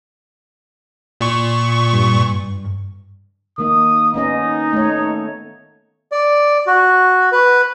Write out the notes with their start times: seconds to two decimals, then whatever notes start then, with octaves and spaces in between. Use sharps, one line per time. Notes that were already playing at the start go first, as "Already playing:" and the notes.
1.21 A#2 C#6
1.93 G2
3.58 D#3 A#3 D#4 D#6
4.14 B3 C#4 D#4 D#5
4.73 A3 C#5
6.12 D5
6.67 F#4
7.32 B4